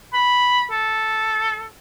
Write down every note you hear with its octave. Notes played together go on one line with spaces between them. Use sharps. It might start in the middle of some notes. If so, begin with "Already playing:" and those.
B5
A4